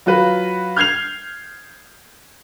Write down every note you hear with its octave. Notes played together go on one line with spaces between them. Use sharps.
F#3 F4 F#4 B4
F6 G6 G#6 C7 F7